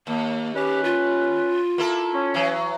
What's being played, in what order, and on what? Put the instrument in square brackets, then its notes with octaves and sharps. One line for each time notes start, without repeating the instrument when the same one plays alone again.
[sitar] D#2 [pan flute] A#3
[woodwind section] C#4 B4 [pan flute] G4
[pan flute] F4
[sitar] A#3 E4 A4
[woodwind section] C#4
[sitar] E3 F#3